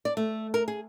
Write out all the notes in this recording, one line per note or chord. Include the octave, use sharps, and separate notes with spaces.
D5
A3
A#4
G#4